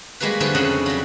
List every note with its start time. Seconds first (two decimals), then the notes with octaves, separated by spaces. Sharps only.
0.20 G3 G#3 A#3 F#4 B4
0.40 D3 F3 G3 A3 G#4 B4
0.55 F2 C#3 C#4 D4 F#5 A5
0.86 F#3 G3